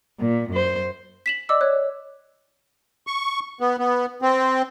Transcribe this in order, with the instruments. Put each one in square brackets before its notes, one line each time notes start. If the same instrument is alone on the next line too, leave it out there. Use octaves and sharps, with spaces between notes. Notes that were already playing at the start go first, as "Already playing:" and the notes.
[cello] A#2
F#2 C5
[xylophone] B6 E7 F#7
D5 D#5 D6 E6
C#5 F#6
[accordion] C#6
B3
B3
C4